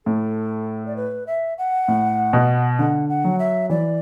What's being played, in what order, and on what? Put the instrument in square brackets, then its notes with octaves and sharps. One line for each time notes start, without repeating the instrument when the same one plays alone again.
[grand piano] A2 [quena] A4
[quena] D5
B4
E5
F#5
[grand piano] A2
B2
[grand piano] D3 [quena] F#5
[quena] F#5
[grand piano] F#3
[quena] E5
[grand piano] E3 [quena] D5